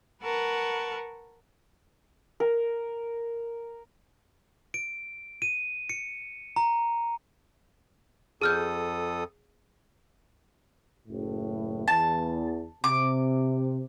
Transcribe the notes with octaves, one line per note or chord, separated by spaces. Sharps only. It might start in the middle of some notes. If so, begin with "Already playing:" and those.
A#4 B4 F#5 A5 C#6
A#4
D7
D#7
C#7
A#5
F2 G#4 A4 D#6 F6 G6
F#1 A2
E2 A5
C3 D6